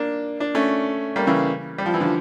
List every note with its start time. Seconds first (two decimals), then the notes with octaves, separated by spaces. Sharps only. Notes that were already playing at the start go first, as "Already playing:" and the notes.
Already playing: A#3 D4
0.40 D4
0.55 A3 C#4
1.16 G3 A#3
1.27 C#3 E3
1.78 G3
1.86 F3
1.94 E3
2.00 D3 F3